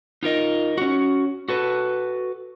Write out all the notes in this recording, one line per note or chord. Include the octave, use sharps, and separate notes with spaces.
D#4 F4 A#4 D#5
C#4 F#4
F#4 A4 B4